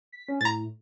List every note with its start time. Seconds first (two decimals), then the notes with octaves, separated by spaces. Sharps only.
0.12 B6
0.29 C#4
0.41 A2 A#5 A6